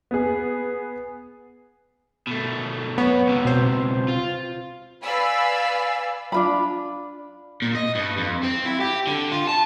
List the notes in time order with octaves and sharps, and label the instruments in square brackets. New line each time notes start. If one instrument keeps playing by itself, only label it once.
[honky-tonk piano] B3 G#4
[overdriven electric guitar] B2 A3
[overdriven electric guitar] F#2 C#5 [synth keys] B3
[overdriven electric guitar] C#2 C3
[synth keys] B2 C5
[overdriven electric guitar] F4
[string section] B4 D5 F5 G#5 B5 E6
[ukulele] D4 F4 B5
[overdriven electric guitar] A#2
D#5
G2
F2
C4
E4
G4
D3
F4
A5